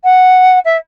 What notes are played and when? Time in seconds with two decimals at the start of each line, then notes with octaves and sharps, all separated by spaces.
0.04 F#5
0.65 E5